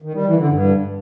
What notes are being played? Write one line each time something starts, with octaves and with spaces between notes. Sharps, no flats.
D#3
G3
E3
D3
G2